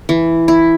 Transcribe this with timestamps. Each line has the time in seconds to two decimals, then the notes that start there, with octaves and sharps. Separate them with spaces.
0.09 E3
0.48 E4